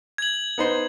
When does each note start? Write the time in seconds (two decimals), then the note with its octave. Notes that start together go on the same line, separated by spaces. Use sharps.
0.18 G#6 F#7
0.58 B3 D#4 C5